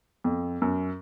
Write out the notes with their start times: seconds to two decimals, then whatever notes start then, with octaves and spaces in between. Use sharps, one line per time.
0.24 F2
0.62 F#2